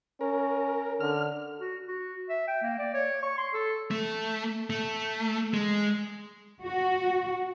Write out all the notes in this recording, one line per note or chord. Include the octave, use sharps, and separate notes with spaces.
C#4 A#4
D3 F6
F#4
F#4
E5
G5
A#3
D5
C#5
C#6
C6
A4
A3
A3
G#3
F#4